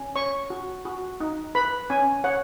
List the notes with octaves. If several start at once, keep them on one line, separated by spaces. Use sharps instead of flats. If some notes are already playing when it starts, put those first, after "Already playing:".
Already playing: C#4
C#5 C#6
F#4
F#4
D#4
B4 B5
C#4 G#5
C#5 F#5